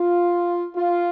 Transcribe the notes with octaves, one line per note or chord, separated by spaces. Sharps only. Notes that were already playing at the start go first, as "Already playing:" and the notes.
Already playing: F4
F4